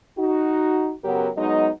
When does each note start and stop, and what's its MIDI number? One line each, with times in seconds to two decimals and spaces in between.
0.18 0.92 63
0.18 0.92 66
1.04 1.29 42
1.04 1.29 49
1.04 1.29 54
1.04 1.29 59
1.04 1.29 67
1.04 1.29 70
1.37 1.68 54
1.37 1.68 56
1.37 1.68 59
1.37 1.68 63
1.37 1.68 75